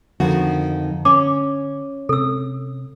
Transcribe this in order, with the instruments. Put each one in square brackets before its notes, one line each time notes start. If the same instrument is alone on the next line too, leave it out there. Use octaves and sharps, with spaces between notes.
[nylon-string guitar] F2 D#3 F#4 [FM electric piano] D3
[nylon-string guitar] C#4 [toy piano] D6
[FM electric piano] C3 [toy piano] A4 E6